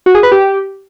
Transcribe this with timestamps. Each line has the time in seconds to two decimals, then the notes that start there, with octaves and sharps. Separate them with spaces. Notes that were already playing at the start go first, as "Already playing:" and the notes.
0.06 F#4
0.15 G#4
0.23 B4
0.32 G4